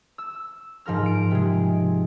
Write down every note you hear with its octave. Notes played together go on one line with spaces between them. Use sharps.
E6
G#2 F3 A#4 F6
D7
C3 G#3